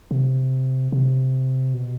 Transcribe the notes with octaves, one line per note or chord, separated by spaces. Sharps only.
C3
C3
B2